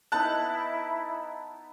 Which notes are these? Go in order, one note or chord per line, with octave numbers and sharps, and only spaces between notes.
B3 D#4 E4 A4 A5 F#6